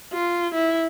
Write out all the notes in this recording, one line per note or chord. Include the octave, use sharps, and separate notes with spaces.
F4
E4